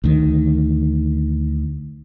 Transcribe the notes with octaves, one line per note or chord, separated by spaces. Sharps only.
D2 D#3